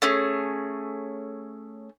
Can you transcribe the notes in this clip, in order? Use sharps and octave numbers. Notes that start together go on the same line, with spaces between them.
A3 C#4 G#4